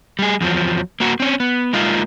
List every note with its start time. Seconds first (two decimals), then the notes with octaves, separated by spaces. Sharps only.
0.19 G3 G#4
0.41 E2 F3 F#3
1.00 A#3 F#4 A#4
1.20 C4 C#4
1.40 B3
1.73 G#3 A#3 D#4 F4